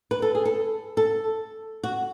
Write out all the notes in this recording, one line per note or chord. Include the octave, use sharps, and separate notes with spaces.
B4
A4
G#4
A4
A4
F#4